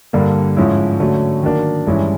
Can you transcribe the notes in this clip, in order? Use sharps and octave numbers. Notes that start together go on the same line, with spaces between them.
G2 D3 G3 A#3
G#2 F3 G#3 C#4 E4
D3 F#3 A3 C#4
D#3 F#3 A#3 D4
G2 E3 G#3 C#4 E4